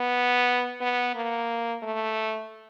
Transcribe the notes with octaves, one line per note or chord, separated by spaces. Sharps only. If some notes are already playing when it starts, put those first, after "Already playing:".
Already playing: B3
B3
A#3
A3